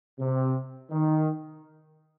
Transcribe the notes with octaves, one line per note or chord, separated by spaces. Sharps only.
C3
D#3